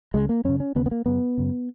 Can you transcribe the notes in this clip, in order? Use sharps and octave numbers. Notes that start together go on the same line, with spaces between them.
C#2 C#3 G#3
A#3
F#2 C#3 C#4
C#4
D#2 C#3 B3
B3
A#3
F#2 C#3 B3
F#2 C#3